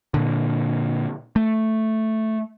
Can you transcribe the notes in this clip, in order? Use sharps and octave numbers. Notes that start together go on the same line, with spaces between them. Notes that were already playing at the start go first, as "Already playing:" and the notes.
A#2 D3
A3